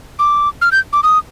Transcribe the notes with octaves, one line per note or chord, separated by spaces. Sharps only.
D6
F6
G6
D6
D#6